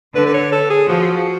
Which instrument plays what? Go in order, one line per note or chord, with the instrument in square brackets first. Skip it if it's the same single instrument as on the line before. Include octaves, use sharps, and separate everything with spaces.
[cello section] D3 [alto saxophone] B4
[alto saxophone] B4
C#5
A4
G#4
[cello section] F3 [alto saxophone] F#4